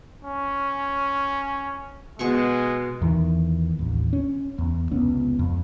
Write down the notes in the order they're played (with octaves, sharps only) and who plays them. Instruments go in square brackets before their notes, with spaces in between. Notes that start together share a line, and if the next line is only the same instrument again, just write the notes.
[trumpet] C#4
[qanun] B2 G#4 C#6 [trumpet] G#3
[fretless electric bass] E2 D#3 E3
A1 D#2
C#4
E2
F1 C#2 B3 C#4
F2